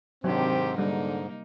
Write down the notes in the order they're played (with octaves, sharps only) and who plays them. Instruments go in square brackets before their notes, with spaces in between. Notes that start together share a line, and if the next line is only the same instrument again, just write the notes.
[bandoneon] G#2 [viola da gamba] C3 D#3 G4 [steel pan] F#3 D4 [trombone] C4
[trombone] D3 [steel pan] G3 [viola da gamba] A#3 D#4